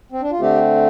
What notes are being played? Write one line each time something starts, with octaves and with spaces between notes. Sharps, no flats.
C4
D4
F4
D3 A3 C4 G4